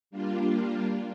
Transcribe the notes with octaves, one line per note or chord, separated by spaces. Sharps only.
G3 A#3 D4 F4